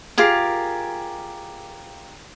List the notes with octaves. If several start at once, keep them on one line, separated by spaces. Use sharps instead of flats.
F4 G4 G#4 A#4